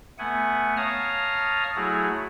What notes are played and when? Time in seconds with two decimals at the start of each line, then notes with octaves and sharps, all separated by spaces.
0.19 A3 B3 F#5 G#5
0.77 C#5 F5 A5 A#5 D#6 F6
1.75 F#3 A3 E4 F#4 G#4